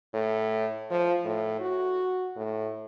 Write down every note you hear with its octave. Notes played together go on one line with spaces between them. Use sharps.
A2
F3
A2
F#4
A2